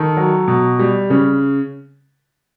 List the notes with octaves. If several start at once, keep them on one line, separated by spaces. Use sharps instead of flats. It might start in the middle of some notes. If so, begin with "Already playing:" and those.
Already playing: D#3 A4
F#3
B2
G3
C#3